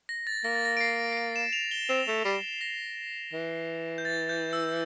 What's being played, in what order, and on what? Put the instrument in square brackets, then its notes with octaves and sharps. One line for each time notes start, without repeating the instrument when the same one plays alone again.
[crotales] A#6
A6
[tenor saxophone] A#3 [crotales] A#6
[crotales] A6
A#6
D7
C7
C7
D7
E7
F7
G7
[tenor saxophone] C4 [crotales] E7
[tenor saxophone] A3
[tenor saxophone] G3 [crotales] C7
[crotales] A#6
[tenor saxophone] E3
[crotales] G6
A6
G6
E6